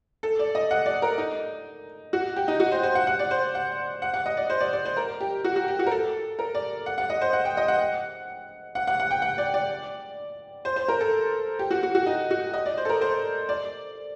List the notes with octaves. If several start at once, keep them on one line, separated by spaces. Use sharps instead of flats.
A4
D5
D#5
F#5
D5
A#4
D#4
F#4
G4
D#4
F#4
C5
C5
F#5
F#5
D5
C5
F#5
F#5
F#5
D#5
D5
C5
D5
D5
C5
A#4
G4
F#4
F#4
G4
F#4
A#4
A4
A#4
D5
F#5
F#5
D#5
C5
F#5
G5
D#5
F#5
F#5
F#5
F#5
G5
F#5
D5
D5
C5
C5
A#4
A4
G4
F#4
F#4
F#4
D#4
F#4
D#5
D5
C5
A4
A#4
C5
D5